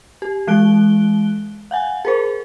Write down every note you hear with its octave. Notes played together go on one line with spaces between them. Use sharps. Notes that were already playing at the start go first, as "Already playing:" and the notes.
G4
E3 G#3 F#6 D7 G7
F5 F#5 G#5
G#4 A#4 C5